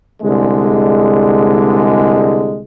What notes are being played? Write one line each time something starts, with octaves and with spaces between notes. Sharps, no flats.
C2 D3 G#3